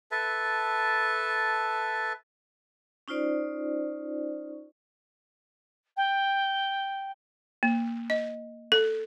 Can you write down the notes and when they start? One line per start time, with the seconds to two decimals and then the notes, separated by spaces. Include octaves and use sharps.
0.11 A4 B4 E5 A5
3.08 C#4 D#4 F4 C5 D5
5.96 G5
7.63 A#3
8.10 D#5
8.72 A4